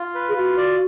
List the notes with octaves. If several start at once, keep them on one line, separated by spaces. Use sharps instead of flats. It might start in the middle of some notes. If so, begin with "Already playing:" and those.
Already playing: F4
B4
G#4
F4 F#4
D5